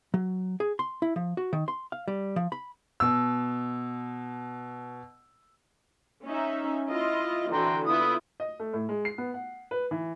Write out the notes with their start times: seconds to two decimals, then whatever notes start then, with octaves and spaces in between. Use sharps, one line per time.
0.14 F#3
0.60 G#4
0.79 C6
1.02 E4
1.16 F3
1.37 F#4
1.53 D#3
1.68 C6
1.92 F5
2.08 G3
2.36 F3
2.52 B5
3.00 B2 E6
6.25 C#4 D#4 E5
6.90 E4 F4 D#5
7.52 D3 E3 F#4 G5 A#5 C6
7.86 B3 E4 F4 D#6
8.40 D#5
8.60 A3
8.73 A2
8.89 G#3
9.05 C7
9.18 B3
9.34 F#5
9.71 B4
9.91 E3